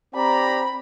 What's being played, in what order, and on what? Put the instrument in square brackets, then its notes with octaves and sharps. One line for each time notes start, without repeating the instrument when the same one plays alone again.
[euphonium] C4 [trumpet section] G4 D5 A#5 [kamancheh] B5